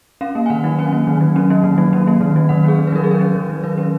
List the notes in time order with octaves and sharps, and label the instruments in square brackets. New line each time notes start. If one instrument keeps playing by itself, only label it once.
[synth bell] C#4 F5
A#3
G#5
D#3 F#5
F#3
C#4 G#5
A#3
D#3
F#3
C#4
A#3
D#3
F#3
C#4
A#3
D#3
F#3
D#3 F#5
C#4 G#4
D#3
B4
F#3 A#4
G#4
D#3 A#4
C#4
D#3
F#3
D#3 B4
C#4